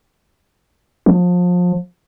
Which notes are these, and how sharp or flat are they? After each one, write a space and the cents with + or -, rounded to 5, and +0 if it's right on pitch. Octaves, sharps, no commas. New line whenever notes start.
F3 +30